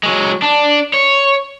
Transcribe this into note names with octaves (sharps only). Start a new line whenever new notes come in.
F#3 G#3
D4
C#5